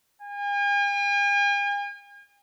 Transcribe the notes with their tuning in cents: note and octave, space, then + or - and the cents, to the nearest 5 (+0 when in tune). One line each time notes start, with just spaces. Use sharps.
G#5 -45